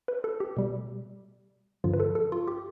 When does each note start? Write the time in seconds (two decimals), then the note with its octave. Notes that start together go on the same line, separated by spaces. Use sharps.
0.08 B4
0.24 A4
0.40 G4
0.57 B2 G3
1.84 G2 D3 F3 F4
1.94 B4
2.00 A4
2.15 A4
2.32 F4
2.48 G4